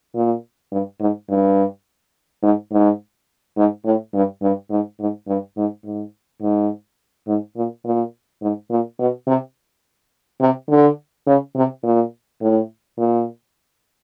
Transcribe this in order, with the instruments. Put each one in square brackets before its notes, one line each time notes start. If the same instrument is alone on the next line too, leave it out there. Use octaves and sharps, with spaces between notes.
[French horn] A#2
G2
G#2
G2
G#2
G#2
G#2
A2
G2
G2
G#2
G#2
G2
G#2
G#2
G#2
G#2
A#2
A#2
G#2
A#2
B2
C3
C3
D3
C#3
C3
A#2
A2
A#2